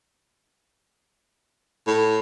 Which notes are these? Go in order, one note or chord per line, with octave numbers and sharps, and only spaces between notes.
A2